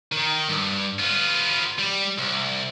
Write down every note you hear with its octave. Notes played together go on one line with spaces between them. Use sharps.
D#3
G2
B3 F4
G3
C2